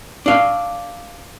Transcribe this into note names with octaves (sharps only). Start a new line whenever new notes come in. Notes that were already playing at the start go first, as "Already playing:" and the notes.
D4 F5